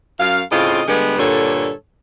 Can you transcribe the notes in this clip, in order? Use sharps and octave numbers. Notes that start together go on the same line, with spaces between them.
F#2 F5
A2 C#3 C4 F4 D#5
D3 G3 G#3 B3
G2 A#2 D3 A4 C#5